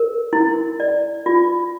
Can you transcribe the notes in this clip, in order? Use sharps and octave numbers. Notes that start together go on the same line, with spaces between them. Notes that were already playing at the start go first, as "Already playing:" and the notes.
Already playing: A#4
E4
D5
F4